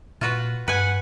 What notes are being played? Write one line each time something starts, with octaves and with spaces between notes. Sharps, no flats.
A#2 F4 F#4 B4
G2 B4 F#5 G#5